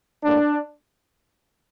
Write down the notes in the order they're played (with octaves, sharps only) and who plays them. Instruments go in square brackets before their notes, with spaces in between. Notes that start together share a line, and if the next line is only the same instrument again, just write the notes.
[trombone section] A2 G3 A#3 D4